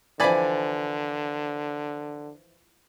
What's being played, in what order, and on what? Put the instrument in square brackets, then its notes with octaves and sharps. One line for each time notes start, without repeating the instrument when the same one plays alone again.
[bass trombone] D3 [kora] E3 F3 [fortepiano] D5 G#5 B5